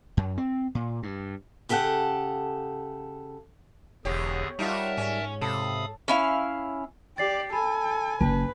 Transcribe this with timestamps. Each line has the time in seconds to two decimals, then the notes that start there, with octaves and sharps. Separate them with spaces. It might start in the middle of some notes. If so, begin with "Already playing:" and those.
0.17 F#2
0.38 C4
0.75 A#2
1.03 G2
1.69 C#3 G4 A4 E5 F#5
4.05 E1 E2 D3 G4 G#4 C#5
4.59 G3 D#4 F4 F#4 A#4 E5 A5
4.97 G#2 C#4
5.41 C3 A4 F5 B5 D#6
6.08 C#4 E4 F5
7.18 G4 D5 A6 C7
7.53 A4 G#5 B5
8.21 F#1 B4 A5